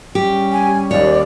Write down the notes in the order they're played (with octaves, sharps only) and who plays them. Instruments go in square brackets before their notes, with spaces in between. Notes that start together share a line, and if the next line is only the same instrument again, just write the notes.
[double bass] G3 C#4 [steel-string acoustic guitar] G4
[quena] G#5
[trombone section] D#2 [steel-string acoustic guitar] C#5 [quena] D5